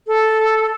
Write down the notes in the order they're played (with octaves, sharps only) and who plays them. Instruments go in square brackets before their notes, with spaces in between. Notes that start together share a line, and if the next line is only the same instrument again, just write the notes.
[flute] A4